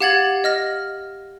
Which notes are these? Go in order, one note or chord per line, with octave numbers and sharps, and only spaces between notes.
G4 F5 F#5 G#6 A6 F#7
D#5 F6 A#6